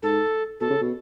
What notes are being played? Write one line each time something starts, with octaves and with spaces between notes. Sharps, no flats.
G#2 A4
B2 A4
C#3
B2